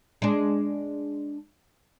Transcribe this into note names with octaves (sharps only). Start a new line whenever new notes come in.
G#3 D4